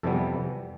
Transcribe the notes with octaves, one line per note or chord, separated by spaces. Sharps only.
F2 C3 E3 G3 B3 A4